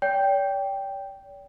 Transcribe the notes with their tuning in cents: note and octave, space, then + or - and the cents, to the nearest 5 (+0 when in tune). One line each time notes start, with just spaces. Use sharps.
D5 -45 G5 +0